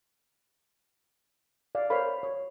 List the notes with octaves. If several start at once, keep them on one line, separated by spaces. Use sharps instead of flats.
D5 F5
A#4 C5 C#5 F5 B5
C#5